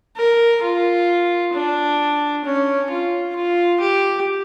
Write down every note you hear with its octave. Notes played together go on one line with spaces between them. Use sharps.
A#4
F4
D4
C#4
F4
F4
G4